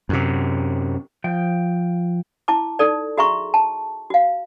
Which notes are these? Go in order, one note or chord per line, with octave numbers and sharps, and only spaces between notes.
F#2 C3
F3 G5
E4 A5 D6
D#4 A4 D5
F#4 G#4 E5 A#5 C6 C#6
A5
F#4 F5